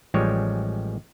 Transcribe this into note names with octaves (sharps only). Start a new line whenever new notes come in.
A1 F3 G3 G#3 C#5